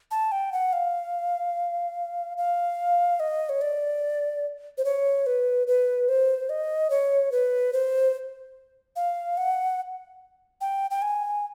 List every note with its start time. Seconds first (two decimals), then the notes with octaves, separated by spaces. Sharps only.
0.11 A5
0.32 G5
0.52 F#5
0.73 F5
2.37 F5
3.20 D#5
3.49 C#5
3.62 D5
4.78 C5
4.85 C#5
5.26 B4
5.67 B4
6.09 C5
6.50 D#5
6.90 C#5
7.32 B4
7.73 C5
8.96 F5
9.37 F#5
10.61 G5
10.91 G5
11.02 G#5